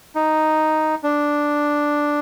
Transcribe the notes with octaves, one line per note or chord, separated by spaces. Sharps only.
D#4
D4